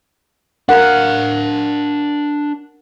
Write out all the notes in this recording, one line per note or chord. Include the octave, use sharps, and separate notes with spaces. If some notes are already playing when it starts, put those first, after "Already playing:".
D4 A#4 F5 F#5